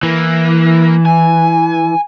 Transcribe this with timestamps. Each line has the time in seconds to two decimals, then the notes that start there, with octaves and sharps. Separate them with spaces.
0.03 E3 A#3
1.05 G#5